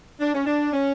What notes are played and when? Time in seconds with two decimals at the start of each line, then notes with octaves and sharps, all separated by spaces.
0.21 D4
0.33 C#4
0.47 D4
0.73 C#4